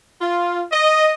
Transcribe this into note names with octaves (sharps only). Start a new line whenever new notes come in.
F4
D#5